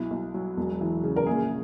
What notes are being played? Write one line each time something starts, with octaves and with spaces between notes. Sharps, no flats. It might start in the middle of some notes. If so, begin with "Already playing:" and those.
Already playing: B1 E4
B1
F#3
E1
E3
C#3
A#4
A#1 G#4